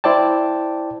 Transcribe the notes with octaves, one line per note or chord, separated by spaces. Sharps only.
E4 C5 D5 G5 A5